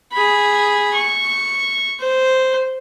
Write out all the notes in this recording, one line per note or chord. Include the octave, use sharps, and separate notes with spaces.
G#4 B5
C#6
C5